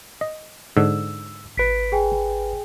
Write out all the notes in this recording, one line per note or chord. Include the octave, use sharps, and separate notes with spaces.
D#5
G#2 D3 E6
G#1 B4 B6 D7
G#4 G5 G#5